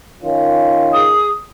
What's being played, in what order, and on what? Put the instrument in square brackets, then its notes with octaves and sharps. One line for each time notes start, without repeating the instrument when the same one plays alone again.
[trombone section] D#3 C#4 F4
[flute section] G#4 D#6